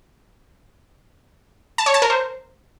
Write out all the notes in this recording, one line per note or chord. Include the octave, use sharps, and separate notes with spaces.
A5
C#5
A5
A#4
C5